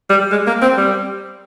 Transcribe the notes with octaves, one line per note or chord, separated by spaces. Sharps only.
G3
G#3
A#3
C4
G3